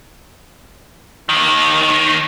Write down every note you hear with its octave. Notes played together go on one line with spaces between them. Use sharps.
D#2 D#3